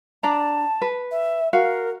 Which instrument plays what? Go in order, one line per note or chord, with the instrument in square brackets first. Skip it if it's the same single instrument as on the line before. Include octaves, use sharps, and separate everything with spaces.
[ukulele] D4 D5 A#5 [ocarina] A5
[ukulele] B4
[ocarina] E5
[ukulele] F#4 F5 [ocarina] A#4